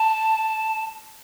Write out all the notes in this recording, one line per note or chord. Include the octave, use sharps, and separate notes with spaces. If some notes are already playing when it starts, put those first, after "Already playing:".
Already playing: A5